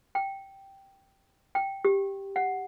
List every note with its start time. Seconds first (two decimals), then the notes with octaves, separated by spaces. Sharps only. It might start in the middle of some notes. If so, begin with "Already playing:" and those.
0.15 G5
1.55 G5
1.85 G4
2.36 F#5